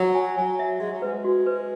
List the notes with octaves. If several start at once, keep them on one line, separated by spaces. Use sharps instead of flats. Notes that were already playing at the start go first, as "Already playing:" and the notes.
Already playing: F#3
G#5
F#3 G#5
E5
G#3 E5
F#3
G#3 B4
F#4
B4